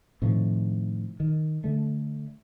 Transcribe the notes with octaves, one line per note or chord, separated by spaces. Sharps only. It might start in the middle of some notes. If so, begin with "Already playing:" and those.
A2 C3 D#3 F3
D#3
D3 A3